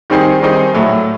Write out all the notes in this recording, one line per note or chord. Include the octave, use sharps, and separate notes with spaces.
D#3 G3 C4 D#4 G#4
D#3 G3 C4 D#4 G#4
A2 F#3 A3